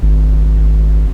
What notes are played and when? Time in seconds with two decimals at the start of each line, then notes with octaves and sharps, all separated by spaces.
0.02 G#1